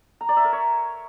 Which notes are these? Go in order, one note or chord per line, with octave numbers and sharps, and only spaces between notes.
A#5
D5
E5
A#4
C#5